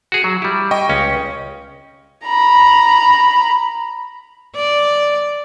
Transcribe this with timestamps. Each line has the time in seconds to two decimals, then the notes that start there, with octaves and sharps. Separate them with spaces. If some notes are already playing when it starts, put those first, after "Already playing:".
0.12 F#4 G#4
0.24 F#3
0.42 G3 E4
0.71 D#5 G5 C#6
0.89 C#2 C#4
2.25 A#5 B5
4.55 D5